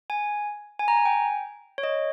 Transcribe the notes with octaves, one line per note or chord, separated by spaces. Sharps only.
G#5
G#5
A#5
G#5
G5
C#5
D#5